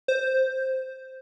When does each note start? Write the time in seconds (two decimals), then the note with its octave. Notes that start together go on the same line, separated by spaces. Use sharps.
0.08 C5